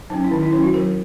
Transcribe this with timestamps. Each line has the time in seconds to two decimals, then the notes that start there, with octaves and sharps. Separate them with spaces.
0.10 F#3 C#4 D#4
0.24 E4
0.31 D#3 D#4
0.42 E4
0.53 F#3 C#4 E4
0.63 F#4
0.74 F#3 A#4